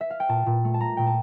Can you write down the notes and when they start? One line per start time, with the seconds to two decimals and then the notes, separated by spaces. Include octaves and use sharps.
0.01 E5
0.10 F5
0.20 G5
0.29 A#2 A5
0.46 A#2
0.64 A3
0.74 A5
0.81 A3 A#5
0.97 A#2 G5
1.07 A5